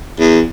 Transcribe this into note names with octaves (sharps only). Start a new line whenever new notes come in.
E2